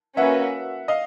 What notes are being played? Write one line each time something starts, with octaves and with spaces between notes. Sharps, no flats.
A#3 C#4 F#4 B4 E5 F#5
D#5 F5